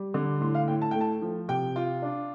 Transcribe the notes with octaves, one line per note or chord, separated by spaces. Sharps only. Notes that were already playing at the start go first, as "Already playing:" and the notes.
Already playing: G3
D3
A2 C6
F5
A2 G5
A5
A3 G5
A5
F3
C3 G5
F4
D4